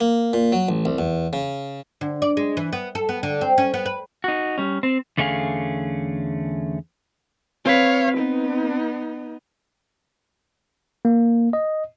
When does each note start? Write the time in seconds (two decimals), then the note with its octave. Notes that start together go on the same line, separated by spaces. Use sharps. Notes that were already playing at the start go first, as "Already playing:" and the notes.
0.01 A#3
0.33 A#2
0.52 F#3
0.69 A1
0.85 C2
0.98 E2
1.33 C#3
2.01 D3
2.22 D5
2.37 G#3
2.57 E3
2.73 B3
2.95 A4
3.09 B3
3.23 D3
3.41 C4
3.58 C#4
3.74 B3
3.86 B4
4.24 D#4 F#4
4.58 G3 C#4
4.83 C4
5.17 E2 D3 A3 C#4 G#4 F5
7.66 C4 B4 C#5 F5
8.18 B3 D#4
11.05 A#3
11.53 D#5